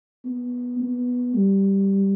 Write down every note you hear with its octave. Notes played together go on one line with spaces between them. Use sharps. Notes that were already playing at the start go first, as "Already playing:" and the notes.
B3
B3
G3